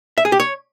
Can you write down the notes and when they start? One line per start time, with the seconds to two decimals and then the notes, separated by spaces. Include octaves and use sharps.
0.18 E5
0.25 G#4
0.32 G4
0.40 C#5